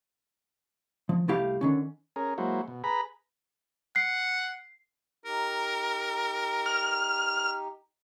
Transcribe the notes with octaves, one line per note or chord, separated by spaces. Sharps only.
F3
C2 A3 E4 G4 F5
D3 D#3 C#4
C#4 G#4 A#4
F#3 G#3 A#3 E4 F#4 C5
B2
G#4 B4 A#5 B5
F#5 C7
D#4 G4 A#4
F6